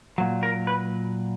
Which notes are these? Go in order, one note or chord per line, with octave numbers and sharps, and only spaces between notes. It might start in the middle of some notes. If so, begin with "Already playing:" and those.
A#2 F#3
A#4
B4